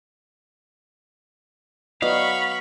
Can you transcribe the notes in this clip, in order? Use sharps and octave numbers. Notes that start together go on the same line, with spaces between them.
F#3 B3 D5 D#5 F5 B5 C#6